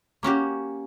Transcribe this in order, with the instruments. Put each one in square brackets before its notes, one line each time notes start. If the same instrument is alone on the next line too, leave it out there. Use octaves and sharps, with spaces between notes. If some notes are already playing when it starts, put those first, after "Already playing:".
[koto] A#3 C#4 F#4 G4